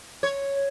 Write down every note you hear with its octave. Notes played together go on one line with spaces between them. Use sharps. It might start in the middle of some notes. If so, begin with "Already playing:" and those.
C#5